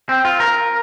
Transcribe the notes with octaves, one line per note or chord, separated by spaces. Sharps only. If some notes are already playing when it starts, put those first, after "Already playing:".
C4
F4
A#4